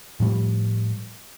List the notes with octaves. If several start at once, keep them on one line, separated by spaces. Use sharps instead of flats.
A2 F3 G3